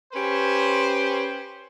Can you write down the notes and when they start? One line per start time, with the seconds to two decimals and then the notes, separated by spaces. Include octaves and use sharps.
0.13 C#4 G4 B4 C5